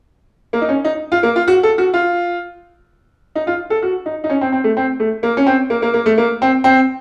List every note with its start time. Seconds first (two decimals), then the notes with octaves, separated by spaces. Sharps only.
0.53 A#3
0.62 D#4
0.69 C#4
0.85 D#4
1.12 F4
1.23 A#3
1.36 F4
1.48 F#4
1.63 A4
1.78 F#4
1.94 F4
3.35 D#4
3.47 F4
3.70 A4
3.82 F#4
4.06 D#4
4.24 D#4
4.29 C#4
4.41 C4
4.52 C4
4.64 A3
4.77 C4
5.00 A3
5.23 A#3
5.37 C#4
5.46 C4
5.70 A#3
5.82 A#3
5.94 A#3
6.06 A3
6.18 A#3
6.42 C4
6.64 C4